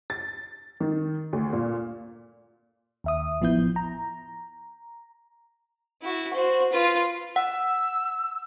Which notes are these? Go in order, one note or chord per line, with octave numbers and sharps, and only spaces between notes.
A6
D#3
D2
A#2
D#2 E5 D#6
A1 F3 B3 E4 G6
A#5
E4 F#4
F#4 C5
F4 B4
F#5 E6